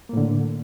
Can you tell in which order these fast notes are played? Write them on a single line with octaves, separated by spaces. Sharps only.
A#3 A2 D3